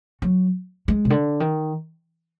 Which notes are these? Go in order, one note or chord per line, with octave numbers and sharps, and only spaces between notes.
F#3
G#3
B2
D3
D#3